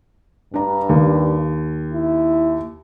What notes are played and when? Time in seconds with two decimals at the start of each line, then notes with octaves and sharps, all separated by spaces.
0.54 G2 D4 A#5
0.89 D#2
1.93 E4